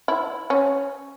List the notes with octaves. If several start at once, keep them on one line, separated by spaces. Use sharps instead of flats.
E4
C#4